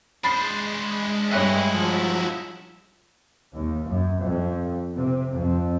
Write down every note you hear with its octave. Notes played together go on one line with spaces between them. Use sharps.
G#3 D4 C5 B5 A6 C7
G2 D#4 E4 C#5 E5 G5 G#5 F#6
F3 F#3
D#2
F#2
F2
C3
F2